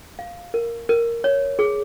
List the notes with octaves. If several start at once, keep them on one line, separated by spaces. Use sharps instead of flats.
F5
A#4
A#4
C#5
G#4